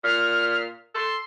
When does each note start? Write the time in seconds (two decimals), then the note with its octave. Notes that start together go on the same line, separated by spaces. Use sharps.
0.04 A#2 F6
0.95 A4 C6